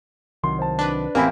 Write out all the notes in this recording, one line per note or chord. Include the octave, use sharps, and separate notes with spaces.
C2 D#3 F#3 C6
C5 A5
D4 B4
A1 A#3 C4 E4 G#5 B5